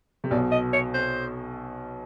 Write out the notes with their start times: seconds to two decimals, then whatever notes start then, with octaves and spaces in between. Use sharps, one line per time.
0.24 C3
0.31 B1 B2 D5
0.52 D#5
0.73 C#5
0.94 C5